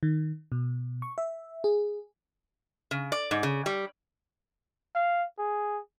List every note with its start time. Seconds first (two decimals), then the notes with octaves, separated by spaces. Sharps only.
0.03 D#3
0.52 B2
1.02 C#6
1.18 E5
1.64 G#4
2.91 C#3
3.12 D5
3.31 G#2
3.43 C#3
3.66 G3
4.95 F5
5.38 G#4